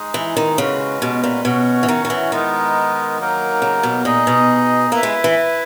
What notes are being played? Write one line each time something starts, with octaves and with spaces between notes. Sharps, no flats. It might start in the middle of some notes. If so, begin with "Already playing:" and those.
Already playing: G#3 D#4 G#4
E3
D#3
C#3 G#3 C#4 F#4 B4
B2
A#2
B2 C#4 F#4 C#5 F#5
E3
D#3
D#3
E3
D#3 G#3 B3 D#4 A#4
F#3 A#3 D#4 A#4
C#3
B2
A#2 D#4 G#4 D#5
B2
A#3 E4 B4 E5
G#3
E3